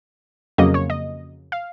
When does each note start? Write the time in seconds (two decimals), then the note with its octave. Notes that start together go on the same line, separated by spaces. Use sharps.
0.58 F2 C#3 F#3 A#3 D#5
0.74 C#5
0.90 D#5
1.52 F5